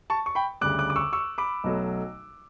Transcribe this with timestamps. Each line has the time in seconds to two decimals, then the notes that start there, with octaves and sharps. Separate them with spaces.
0.10 A5 C#6
0.26 C#6
0.35 G5 B5
0.61 D2 C#3 G3 D6 F#6
0.79 D6 F#6
0.90 D6
0.96 C#6 E6
1.13 C#6 E6
1.38 B5 D6
1.64 B1 B2 F#3 A3